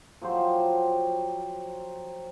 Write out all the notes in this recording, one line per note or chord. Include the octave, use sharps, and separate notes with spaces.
F3 F#3 G4 C5